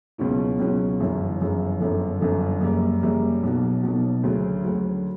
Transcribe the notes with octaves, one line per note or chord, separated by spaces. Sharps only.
C#2 B2 F#3 C#4 E4
C#2 B2 F#3 C#4 E4
G1 F#2 C#3 E3
G1 F#2 C#3 E3
G1 F#2 D3
G1 F#2 D3
F#2 C#3 G3 A#3
F#2 C#3 G3 A#3
B1 B2 F#3
B1 B2 F#3
D2 C#3 F#3
D2 C#3 F#3